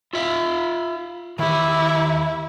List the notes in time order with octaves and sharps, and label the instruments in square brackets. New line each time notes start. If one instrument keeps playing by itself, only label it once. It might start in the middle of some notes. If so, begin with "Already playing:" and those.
[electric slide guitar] F4 E5 F5
[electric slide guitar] D#3 G4 [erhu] E4